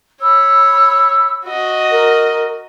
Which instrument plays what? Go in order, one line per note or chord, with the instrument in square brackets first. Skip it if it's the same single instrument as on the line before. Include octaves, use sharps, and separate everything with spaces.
[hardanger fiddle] C#5 [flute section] B5 E6
[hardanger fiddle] F#4 D#5
[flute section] A#4